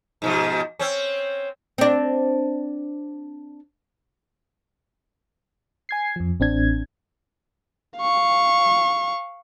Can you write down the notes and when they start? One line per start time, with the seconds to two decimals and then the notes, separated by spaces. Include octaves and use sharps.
0.22 G#2 B2 F3
0.79 C4 C#4
1.78 C4 D4
5.89 G#5 G#6 C7
6.16 F2 F3
6.40 A1 C4 D4 G#6
7.99 F5 C#6